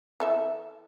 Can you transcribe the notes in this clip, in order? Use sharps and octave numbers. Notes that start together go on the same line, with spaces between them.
E3 A4 E5